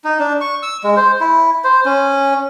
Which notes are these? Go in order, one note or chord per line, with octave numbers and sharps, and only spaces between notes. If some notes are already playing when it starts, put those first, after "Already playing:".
D#4
D4
C#6
E6
G#3
C5
E4
C5
C#4